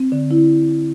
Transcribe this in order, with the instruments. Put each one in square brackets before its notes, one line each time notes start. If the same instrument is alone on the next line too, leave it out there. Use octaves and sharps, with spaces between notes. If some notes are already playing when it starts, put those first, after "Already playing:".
Already playing: [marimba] C4
D3
E4